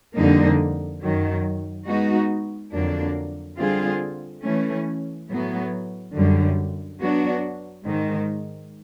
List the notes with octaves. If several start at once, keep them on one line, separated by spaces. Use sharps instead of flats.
F2 D3 G3 A#3 D#4
F#2 D#3 F#3
G#3 B3 D#4 F#4
F2 D3 F#3 A#3 D4
D3 G3 C4 F4 G#4
E3 A3 C#4
A2 F#3 B3
F#2 D3 G3
F#3 B3 D4 F#4
G#2 D#3 G#3